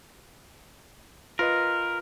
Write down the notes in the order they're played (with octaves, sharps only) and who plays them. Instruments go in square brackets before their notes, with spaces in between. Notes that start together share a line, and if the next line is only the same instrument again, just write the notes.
[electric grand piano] F4 B4 D#5 [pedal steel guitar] A#4